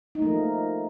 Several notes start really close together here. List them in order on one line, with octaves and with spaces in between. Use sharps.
D#4 A3 A#3 F3